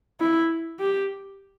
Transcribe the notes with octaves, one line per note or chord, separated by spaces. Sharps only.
E4
G4